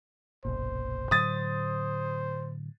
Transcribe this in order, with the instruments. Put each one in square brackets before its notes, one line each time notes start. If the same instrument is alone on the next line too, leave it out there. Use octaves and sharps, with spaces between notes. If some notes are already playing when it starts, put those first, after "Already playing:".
[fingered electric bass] F#1 B1 A#2 [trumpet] C5
[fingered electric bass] A2 D3 F#3 [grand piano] D#6 A6